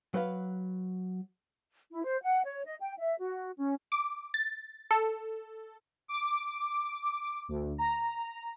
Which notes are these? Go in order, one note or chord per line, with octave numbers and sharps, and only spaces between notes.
F#3 B4 F5
E4
C5
F#5
C#5
D#5
G5
E5
F#4
C#4
D6
A6
A4
D6
D2
A#5